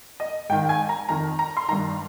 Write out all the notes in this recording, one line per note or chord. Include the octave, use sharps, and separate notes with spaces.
D#5
G#2 D#3 G5
G#5
A#5
F2 D#3 A#5
A#5
C6
G2 D#3 A#5